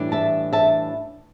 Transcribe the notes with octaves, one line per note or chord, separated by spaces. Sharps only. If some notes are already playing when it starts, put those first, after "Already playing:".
Already playing: A2 E3 G3 D4
E5 A5
E5 A5